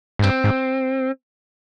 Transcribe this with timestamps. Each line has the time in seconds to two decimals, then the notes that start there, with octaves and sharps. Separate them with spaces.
0.19 G#2
0.24 G2 C4
0.44 G#2